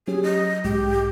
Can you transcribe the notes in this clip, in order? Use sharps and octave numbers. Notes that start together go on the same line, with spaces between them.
F#3 C#4 G4 G#4
D#5
B1 G#2 G#3 G4